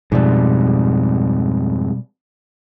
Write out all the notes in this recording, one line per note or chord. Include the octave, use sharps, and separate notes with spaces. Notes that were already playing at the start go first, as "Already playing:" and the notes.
F2 G#2 B2 G3 D5